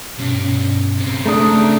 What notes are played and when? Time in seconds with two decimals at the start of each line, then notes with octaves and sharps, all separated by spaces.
0.19 G2 B2 C#4
0.98 C#3 C4
1.26 A3 D4 G#4 A#5 D#6